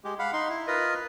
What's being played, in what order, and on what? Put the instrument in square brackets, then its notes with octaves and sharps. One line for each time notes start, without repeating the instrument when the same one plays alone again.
[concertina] G#3 G4
F5 F#5 B5
D#4 C6
E4
F4 A#4 B4 D#5